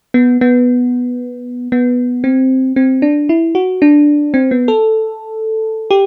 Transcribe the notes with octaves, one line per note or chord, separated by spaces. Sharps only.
B3
B3
B3
C4
C4
D4
E4
F#4
D4
C4
B3
A4
G4